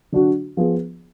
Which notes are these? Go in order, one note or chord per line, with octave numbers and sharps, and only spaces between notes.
D3 F#3 D4 F#4
F3 B3 F4 G#4